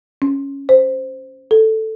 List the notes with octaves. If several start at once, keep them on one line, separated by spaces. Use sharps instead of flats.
C#4
C5
A4